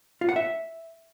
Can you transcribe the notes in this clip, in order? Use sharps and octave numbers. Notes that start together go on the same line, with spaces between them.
F4
F#5
E5